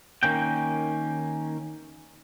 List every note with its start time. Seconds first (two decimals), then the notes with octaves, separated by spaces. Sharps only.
0.23 D#3 A#3 C#4 G5